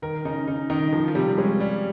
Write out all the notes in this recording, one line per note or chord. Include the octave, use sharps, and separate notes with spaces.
D#3 A#4
C#3 D#4
C#3 D#4
D#3 D#4
D#3 F3
F3
C3 G3
G#3 C#4
G3